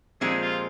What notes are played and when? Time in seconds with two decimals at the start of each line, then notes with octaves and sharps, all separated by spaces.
0.21 A#2 F3 G#3 C4 G4 G#4
0.42 F4